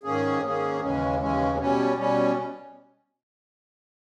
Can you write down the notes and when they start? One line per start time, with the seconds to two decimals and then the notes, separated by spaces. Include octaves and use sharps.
0.03 G#2 D#3 A#3 C#4 G#4
0.42 G#2 D#3 A#3 C#4 G#4
0.81 D#2 C#3 E3 G#3 C#4
1.20 D#2 C#3 E3 G#3 C#4
1.58 B2 G3 C#4
1.96 B2 G3 C#4